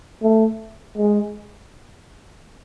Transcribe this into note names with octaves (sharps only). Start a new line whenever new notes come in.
A3
G#3